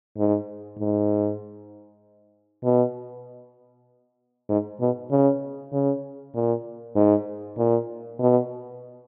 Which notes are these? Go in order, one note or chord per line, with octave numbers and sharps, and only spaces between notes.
G#2
G#2
B2
G#2
B2
C#3
C#3
A#2
G#2
A#2
B2